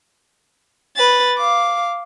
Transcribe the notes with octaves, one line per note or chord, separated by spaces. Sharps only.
B4 A6
F5 D6